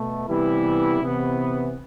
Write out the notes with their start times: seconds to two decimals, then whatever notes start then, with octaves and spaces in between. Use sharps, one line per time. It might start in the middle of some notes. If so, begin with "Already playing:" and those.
Already playing: B2 A3
0.27 C3 E3 G3 B3 E4
1.00 C3 E3 B3